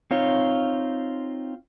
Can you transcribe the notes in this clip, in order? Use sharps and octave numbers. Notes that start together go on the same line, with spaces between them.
C4 D#4 F4 C#5